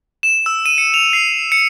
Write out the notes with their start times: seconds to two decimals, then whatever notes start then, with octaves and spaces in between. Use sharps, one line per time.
0.23 E7
0.46 E6
0.66 D#7
0.78 C#7
0.94 F7
1.13 C7
1.52 C#7